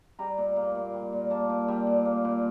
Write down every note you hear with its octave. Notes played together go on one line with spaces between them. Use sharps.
G3 A#5
A#2
A#3
A#2
G3
A#2
A#3 A5
A#2
G3
A#2
A#3
A#2